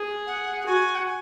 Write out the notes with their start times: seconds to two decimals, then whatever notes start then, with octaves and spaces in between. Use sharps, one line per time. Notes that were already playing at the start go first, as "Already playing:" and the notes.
Already playing: G#4
0.27 F#5
0.60 F#5
0.66 F#4 G#5
0.95 F#5
1.06 G#5